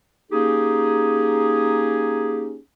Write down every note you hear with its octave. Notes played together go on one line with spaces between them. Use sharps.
A#3 C#4 D#4 G4 G#4